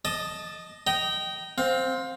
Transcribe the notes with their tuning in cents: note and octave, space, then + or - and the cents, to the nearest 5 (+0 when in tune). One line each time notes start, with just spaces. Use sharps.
D#5 +0 A5 -5 D#6 -45
D#5 +0 G5 -20 A#5 +0
C4 +0 F5 +25